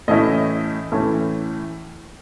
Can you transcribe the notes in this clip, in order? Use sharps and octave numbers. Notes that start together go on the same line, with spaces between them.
A2 E3 A3 C#4 E4 D#5
A2 E3 A3 C#4 E4